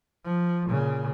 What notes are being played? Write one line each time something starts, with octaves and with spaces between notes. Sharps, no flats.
F3
A#2 C#3